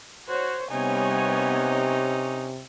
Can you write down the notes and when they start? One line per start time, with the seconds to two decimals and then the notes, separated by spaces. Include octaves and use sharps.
0.29 F#4 C5 C#5
0.71 C3 G3 B3 C#4 D#4 C#5 G#5